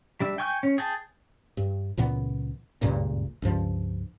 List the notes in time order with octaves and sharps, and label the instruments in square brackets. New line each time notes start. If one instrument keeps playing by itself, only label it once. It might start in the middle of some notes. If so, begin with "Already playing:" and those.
[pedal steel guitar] G3 D4 E5
G5 G#5 C#6 E6 G6
C#4
G#4 G5 A5
[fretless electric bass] G2
C#2 A#2 E3 B3
F#1 C#2 G2 A#2
C#2 G2 F3